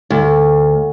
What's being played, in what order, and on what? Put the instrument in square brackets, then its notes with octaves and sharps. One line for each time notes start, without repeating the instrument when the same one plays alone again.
[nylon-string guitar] D2